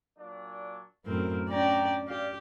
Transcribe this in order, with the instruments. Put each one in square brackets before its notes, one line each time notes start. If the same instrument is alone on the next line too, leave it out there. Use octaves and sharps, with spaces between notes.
[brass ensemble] A#2 F#3 D4
[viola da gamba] F#2 A2 C4 [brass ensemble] A#4
[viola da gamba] C#4 D4 D5 [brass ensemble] G5 A#5
[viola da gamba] G4 [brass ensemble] D5 F5